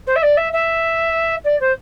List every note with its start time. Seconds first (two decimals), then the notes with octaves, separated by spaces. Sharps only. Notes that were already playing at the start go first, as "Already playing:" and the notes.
0.06 C5
0.15 E5
0.22 D5
0.37 E5
0.52 E5
1.44 D5
1.60 C5